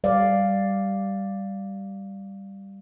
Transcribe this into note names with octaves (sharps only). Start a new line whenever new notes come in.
G3 D5 F5